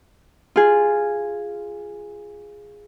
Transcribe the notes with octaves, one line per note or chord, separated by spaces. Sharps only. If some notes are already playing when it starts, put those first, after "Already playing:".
F4 G#4